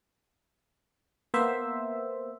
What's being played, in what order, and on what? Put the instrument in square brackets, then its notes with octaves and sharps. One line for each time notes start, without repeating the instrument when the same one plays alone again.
[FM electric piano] A#3 B3 C5 E5